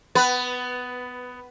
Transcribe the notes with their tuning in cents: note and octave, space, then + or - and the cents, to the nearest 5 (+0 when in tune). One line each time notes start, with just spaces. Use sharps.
B3 +15 B4 +0